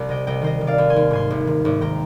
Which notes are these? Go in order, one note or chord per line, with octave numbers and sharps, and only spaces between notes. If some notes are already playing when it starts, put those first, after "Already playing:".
Already playing: C2 C5
C3 D#5 G5
C2 D#5 G5
D#3 C5 D#5
D#3
D5 F5
D#2
G#5 C6
D#2
G#2 G#5 C6
G#1
D#3
G#1
D#3 G5 A#5